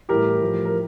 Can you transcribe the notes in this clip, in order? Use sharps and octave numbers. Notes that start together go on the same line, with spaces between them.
A2 E3 G3 G4 A#4
A2 F3
A#4